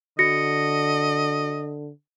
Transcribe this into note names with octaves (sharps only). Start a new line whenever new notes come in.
D3 F#4 D#5 A#6 C#7